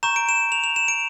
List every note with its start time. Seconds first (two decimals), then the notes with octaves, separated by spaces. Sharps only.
0.03 A#5 C#6 G6 E7
0.16 D7
0.29 E7
0.52 F7
0.64 F7
0.76 E7
0.88 D7